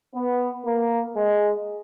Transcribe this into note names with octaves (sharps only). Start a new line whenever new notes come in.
B3
A#3
G#3